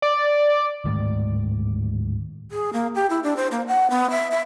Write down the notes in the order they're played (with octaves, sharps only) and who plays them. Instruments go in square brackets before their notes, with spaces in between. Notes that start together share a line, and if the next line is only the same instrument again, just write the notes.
[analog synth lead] D5
[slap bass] D1 G#2 D#3 A3
[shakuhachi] G#4
A#3
G4
E4
D4
C5
A#3
F#5
B3
E5
E5